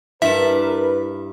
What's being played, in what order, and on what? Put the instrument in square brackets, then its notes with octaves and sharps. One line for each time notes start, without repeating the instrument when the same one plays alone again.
[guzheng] G2 A5 [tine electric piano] E4 [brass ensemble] A#4 B4 [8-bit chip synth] E5